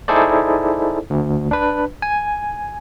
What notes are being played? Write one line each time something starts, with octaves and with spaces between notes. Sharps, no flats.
D#4 E4 G#4 A4 C5 D5
D2
D4 B4
G#5